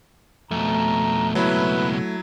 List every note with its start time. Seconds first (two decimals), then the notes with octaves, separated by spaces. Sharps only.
0.51 F2 B2 A3 A#5
1.35 C#2 B2 F#3 E4 B4